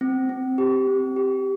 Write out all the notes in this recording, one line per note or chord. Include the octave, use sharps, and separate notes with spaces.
C4
C4
G4
C4
G4